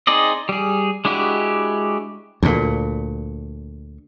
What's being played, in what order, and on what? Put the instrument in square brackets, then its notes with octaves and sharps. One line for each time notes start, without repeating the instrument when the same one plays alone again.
[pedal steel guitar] C4 D#4 G#4 D5 D#5
G3 G#4
G#3 D4 E4 F#4 G4
[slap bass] D2 A#2